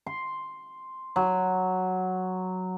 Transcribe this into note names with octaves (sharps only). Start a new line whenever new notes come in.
C6
F#3